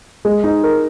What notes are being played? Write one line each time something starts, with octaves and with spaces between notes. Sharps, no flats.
G#3
D#4
A#4